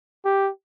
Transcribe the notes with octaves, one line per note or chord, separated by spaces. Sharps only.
G4